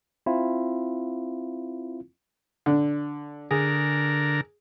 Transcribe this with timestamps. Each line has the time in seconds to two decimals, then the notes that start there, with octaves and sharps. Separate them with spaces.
0.26 C4 E4 F4
2.66 D3
3.51 D3 G#4 A#4